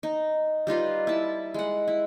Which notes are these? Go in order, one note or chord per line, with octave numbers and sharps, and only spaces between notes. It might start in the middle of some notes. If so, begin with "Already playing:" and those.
D#4
G3 D#4 F4 B4
E4 A5
G#3 F#5
E4